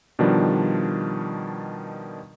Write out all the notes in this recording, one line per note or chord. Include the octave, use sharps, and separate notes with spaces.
B2 D#3 F3 G3 D4